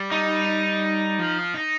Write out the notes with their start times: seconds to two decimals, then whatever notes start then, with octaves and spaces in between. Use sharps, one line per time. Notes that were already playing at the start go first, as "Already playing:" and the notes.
Already playing: G3
0.12 D#4
1.19 F3
1.54 D#4